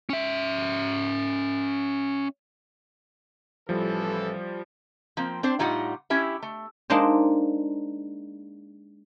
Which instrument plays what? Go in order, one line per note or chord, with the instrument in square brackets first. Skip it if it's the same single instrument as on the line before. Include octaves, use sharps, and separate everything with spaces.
[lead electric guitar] C#4 E5
[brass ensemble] A1 E3 A4 [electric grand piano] F3 G3
[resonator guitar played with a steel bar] F3 A#3 C4
C4 D4 C5
A2 G3 D#4 F4 F#5
C#4 E4 G4 E5
A3
[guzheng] G#3 A#3 D4 D#4 C5